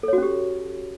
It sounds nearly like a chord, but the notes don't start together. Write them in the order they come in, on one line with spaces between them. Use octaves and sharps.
A4 C#5 F#4 C#4 G4